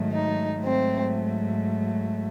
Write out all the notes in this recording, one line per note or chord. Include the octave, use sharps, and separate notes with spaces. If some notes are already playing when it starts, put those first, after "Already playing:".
Already playing: G#2 D#3 F#3 A3
D#4
G#2 F#3 A3 C4